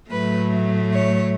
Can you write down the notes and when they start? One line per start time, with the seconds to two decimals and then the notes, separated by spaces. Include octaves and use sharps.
0.11 A2 F#3 A3 B4
0.95 C#5